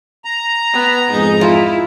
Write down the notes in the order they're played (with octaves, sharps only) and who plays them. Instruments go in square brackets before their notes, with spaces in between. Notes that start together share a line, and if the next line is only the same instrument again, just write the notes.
[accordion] A#5
[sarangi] B3
[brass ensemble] F2 G#2 G#3 [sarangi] D#4
[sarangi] E4 [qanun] F4